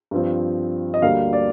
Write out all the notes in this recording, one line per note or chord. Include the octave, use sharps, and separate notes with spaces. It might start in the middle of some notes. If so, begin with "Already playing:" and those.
G2 F3 C4
D#5
D2 D3 G3 A#3 F5
D5